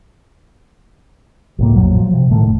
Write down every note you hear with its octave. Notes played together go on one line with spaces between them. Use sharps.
C#2 A2 A#3
A#1 F2 A2 F#3
F3 F#3
C3
A2 D#3 A3
F1